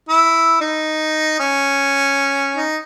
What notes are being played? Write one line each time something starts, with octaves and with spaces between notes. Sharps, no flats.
E4
D#4
C#4
D#4